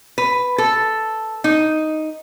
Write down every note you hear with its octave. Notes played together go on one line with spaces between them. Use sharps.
B4
A4
D#4